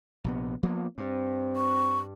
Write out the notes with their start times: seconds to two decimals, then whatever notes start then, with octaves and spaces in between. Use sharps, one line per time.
0.24 A#1 C3 B3
0.63 F3 A#3 B3
0.98 G2 C4
1.56 C#6